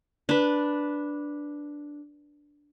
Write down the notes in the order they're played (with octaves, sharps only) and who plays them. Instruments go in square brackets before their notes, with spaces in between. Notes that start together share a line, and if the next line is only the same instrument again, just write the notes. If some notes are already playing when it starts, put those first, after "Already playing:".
[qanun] D4 B4